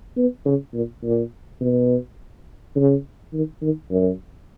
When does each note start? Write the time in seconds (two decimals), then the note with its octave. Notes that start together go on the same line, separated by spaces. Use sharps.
0.16 B3
0.45 C#3
0.74 A#2
1.03 A#2
1.61 B2
2.75 C#3
3.33 D#3
3.62 D#3
3.90 F#2